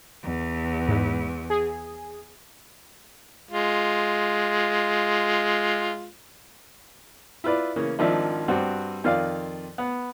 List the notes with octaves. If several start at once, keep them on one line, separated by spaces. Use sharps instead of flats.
E2
G#2
G#4
G#3 F4
E4 F4 B4 D5
C#3 E3 A#3 C#4
G#1 D#3 F3 D4 E5
G2 G3 C4 F#4
F2 D#3 F4 D5 F5
B3